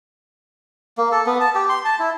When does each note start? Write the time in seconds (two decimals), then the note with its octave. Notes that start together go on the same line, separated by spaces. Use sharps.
0.98 A#3
1.12 A4
1.26 B3
1.41 A5
1.55 G4
1.69 C6
1.85 A5
1.99 E4